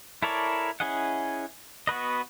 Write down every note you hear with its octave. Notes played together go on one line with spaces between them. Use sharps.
E4 A4 A#4 C#5 D5
C#4 E4 G#4 D#5 F#5
B3 F#4 B4 D#5